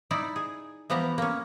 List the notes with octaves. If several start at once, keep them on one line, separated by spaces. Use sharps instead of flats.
D#4 E4 D5
G#4
E3 F3 B3 G4 A#5
A#3 C#4